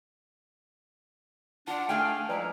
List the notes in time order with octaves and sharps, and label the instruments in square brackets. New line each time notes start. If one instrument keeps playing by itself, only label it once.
[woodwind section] D4 [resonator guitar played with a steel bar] F4 [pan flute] F#5 [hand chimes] A5
[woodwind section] A3 F5 [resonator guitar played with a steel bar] D4 G#4 G5 [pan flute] G#5
[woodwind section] F3 G#3 E4 [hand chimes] B4 D5 F6 [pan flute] A#5